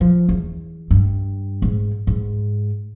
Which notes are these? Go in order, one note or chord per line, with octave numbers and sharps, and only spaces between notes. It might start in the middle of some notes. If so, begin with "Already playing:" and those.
F3
E2
G2
G#2
G#2